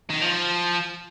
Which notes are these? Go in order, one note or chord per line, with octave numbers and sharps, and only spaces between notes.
D#3
F3